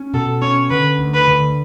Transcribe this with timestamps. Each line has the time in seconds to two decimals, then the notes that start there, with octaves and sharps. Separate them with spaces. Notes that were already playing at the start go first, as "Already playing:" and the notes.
Already playing: C#4
0.14 B2 A4
0.42 C#4 C#5
0.70 D3 B4
0.99 D2
1.14 B4
1.28 D3